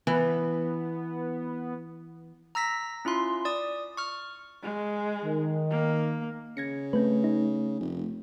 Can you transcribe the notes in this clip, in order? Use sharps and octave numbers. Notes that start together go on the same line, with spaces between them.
E3 B3
A#5 E6 A#6 B6
C#4 E4 F4 C6
D5 D#6
C#6 F6
G#3
D#3
A#3
C#3 G#6 A#6 C#7
A3 C4 B4
D#4
F1